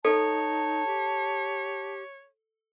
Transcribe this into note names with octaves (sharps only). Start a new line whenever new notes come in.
D#4 A4 C#5 A5
G4